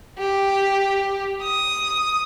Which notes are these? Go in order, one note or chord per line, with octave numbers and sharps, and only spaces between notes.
G4
D#6